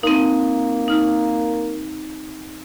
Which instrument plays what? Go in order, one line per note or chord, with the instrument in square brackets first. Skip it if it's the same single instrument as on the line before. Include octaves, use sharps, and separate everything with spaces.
[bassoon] A#3 [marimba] C4 D#4
[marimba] D#4 F6